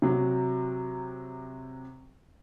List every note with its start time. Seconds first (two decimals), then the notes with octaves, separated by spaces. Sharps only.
0.02 C3 F#3